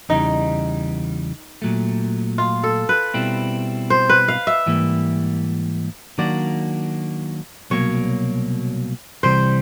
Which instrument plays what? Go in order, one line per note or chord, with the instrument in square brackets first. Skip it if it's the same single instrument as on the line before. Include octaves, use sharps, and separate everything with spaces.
[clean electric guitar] E2 C#3 E3 G3 [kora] D#4
[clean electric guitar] A#2 F#3 A3
[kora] F4
A4
B4
[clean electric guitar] B2 G3 C4 E4
[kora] C5
B4
F5
E5
[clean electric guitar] G#2 E3 G3 A#3
[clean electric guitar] D#3 F#3 A#3 D4 F#4 [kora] D5
[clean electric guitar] C2 B2 F#3 A#3 [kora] C#5
[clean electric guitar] C2 C3 E3 G3 [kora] C5